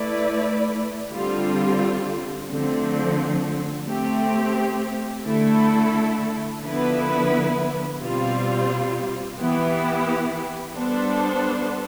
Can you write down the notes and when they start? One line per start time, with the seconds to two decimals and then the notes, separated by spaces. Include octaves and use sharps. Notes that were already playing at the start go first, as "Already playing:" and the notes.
Already playing: A3 E4 B4 D5
1.11 D3 G3 C4 F4
2.49 D3 F3 A3 C4
3.87 A3 C4 G4
5.25 D3 A3 E4 A4
6.63 D3 F3 B3 E4 B4
8.01 B2 G3 C4 F4
9.40 E3 B3 E4 G4
10.77 G3 B3 D4 A4 C5